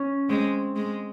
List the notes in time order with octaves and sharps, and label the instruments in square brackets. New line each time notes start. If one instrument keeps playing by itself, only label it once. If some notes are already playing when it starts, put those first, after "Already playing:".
Already playing: [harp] C#4
[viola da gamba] G#3 [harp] C4
[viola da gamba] G#3